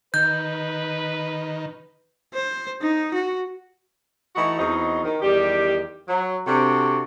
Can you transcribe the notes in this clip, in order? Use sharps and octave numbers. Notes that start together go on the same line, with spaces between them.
D#3 B4 G6
C5
D#4
F#4
E3 A3 D#4 F#4
E2 C4 D#4 F#4 D#5
D#3
E2 D#3 G3 G4
F#3
C3 C4 D4 F#4 A4